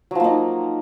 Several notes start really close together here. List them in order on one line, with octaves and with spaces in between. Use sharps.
F#3 F3 A#3 D#4